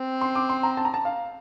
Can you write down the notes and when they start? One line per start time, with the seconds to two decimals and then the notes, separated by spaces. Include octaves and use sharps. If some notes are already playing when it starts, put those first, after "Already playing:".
Already playing: C4
0.21 C6
0.35 D6
0.49 C6
0.63 A#5
0.77 A5
0.85 A#5
0.94 A5
1.05 F5